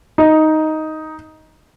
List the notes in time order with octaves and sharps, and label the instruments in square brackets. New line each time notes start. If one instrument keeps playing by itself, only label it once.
[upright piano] D#4